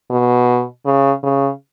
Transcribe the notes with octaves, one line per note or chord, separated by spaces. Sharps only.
B2
C#3
C#3